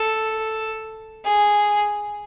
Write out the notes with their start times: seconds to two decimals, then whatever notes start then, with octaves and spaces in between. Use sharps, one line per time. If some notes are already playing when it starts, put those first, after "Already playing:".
Already playing: A4
1.25 G#4